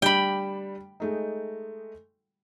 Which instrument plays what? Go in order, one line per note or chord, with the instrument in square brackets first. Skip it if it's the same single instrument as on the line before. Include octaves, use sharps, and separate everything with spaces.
[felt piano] G3 D4 [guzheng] G5 B5
[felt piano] G#3 A3 D#4